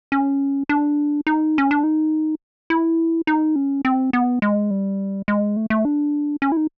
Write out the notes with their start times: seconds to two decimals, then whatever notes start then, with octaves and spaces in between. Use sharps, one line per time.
0.12 C#4
0.69 D4
1.27 D#4
1.58 C#4
1.71 D4
1.84 D#4
2.70 E4
3.27 D#4
3.56 C#4
3.85 C4
4.13 B3
4.42 G#3
4.71 G3
5.28 G#3
5.57 A3
5.70 A3
5.85 D4
6.42 C#4
6.52 E4
6.57 D#4